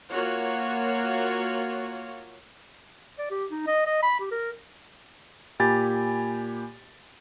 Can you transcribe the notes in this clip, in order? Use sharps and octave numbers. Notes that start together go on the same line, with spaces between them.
A#3 F4 F#4 C#5
D5
G4
D#4
D#5
D#5
B5
G4
A#4
A#2 G4 G#5 B5 A6